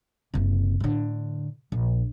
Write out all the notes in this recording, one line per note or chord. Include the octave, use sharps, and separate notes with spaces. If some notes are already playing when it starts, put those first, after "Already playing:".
F#1 C3
A2 D3
A#1